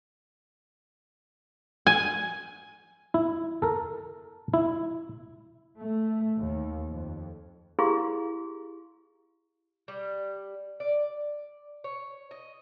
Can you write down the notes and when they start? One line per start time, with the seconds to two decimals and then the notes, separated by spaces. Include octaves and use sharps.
1.87 G#5
3.14 E4
3.62 A4 A#4
4.54 E4
5.79 A3
6.38 D#2
6.92 F2
7.79 E4 G4 G#4 F5 C6
9.88 G3
10.80 D5
11.84 C#5
12.31 D#5